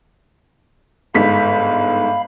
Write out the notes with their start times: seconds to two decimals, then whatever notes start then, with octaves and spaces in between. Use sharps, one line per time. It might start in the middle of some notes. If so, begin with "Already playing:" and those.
1.14 G1 G#2 F5 B5 B6